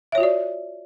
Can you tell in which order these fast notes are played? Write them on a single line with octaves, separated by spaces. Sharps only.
E5 C#5 F4 F#4 D5